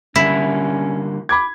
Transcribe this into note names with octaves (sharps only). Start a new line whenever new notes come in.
D3 G3 A#3 C#4 E4
B5 D6 G#6